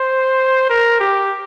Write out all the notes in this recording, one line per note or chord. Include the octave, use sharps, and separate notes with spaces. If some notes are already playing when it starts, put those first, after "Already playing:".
Already playing: C5
A#4
G4